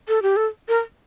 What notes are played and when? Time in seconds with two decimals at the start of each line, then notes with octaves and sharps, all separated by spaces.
0.09 A4
0.22 G4
0.37 A4
0.68 A#4